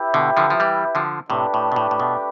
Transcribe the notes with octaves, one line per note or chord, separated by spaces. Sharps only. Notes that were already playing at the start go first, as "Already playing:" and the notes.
Already playing: E4 G4 B4 E5 G5
B2 D3
D3 F3
F3
E3 G3
D3 F3
A2 C3 A3 D4 G4 B4
A2
B2
A2
A2
B2